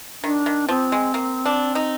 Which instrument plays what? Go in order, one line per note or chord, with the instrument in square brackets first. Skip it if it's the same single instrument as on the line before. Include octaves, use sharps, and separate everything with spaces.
[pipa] D#3 [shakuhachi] D4
[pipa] D#3
[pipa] F3 [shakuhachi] C4
[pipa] G#3
A#3
D4
D#4